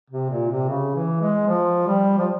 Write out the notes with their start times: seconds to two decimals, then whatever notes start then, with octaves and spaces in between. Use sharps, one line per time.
0.10 C3
0.30 A#2
0.49 C3
0.69 C#3
0.95 E3
1.21 G#3
1.47 F3
1.86 G3
2.18 F3